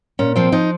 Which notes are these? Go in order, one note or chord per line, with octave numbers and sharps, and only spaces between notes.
A#2 C#4
F3 C4
F3 D#4